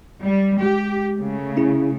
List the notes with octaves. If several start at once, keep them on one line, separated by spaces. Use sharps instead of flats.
G3
G#3 G4
C#3 A3
C#4 E4 G#4